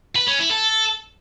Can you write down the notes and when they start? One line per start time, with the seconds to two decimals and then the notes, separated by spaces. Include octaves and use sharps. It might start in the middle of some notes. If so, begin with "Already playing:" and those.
0.16 B4
0.28 C#4
0.39 E4
0.51 A4